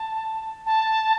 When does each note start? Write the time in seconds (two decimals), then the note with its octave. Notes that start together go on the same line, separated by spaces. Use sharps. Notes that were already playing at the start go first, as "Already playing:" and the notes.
Already playing: A5
0.66 A5